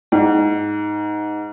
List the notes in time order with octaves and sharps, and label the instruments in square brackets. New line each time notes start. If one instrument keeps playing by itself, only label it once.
[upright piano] G#2